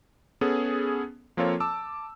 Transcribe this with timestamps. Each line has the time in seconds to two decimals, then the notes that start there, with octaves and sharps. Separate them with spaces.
0.41 B3 C#4 G#4 A4
1.37 F3 A#3 C4 F4 A4 C#5
1.60 A5 D6 E6